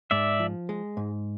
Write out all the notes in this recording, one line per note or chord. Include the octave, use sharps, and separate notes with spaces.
G#2 D5 E5
F3
G#3
G#2